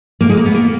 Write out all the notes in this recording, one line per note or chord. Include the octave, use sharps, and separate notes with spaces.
A#3
G#3
A#3
B3
A#3